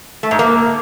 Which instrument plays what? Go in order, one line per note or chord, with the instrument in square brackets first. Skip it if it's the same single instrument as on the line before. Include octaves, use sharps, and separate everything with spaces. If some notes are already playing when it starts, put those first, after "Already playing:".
[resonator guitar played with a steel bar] A3
G#2
A#3